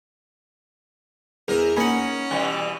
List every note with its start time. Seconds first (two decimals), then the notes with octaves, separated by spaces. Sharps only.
1.48 E2 E3 A#4
1.76 A#3 C#4 D#4 F#5 G#5 B5
2.31 B2 E3 G3